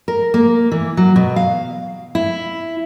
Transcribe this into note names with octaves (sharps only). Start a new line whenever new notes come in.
A#4
A#3
E3
F#3
B2
F5
E4